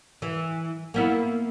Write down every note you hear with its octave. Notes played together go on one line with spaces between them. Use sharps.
E3
A#3 B3 E4